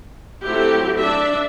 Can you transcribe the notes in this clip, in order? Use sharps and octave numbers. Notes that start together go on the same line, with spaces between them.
F#3 A3 C4 E4 G4
D4 D5 E5